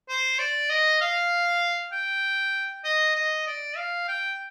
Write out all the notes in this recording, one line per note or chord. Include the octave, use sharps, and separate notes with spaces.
C5
D5
D#5
F5
G5
D#5
D#5
D5
F5
G5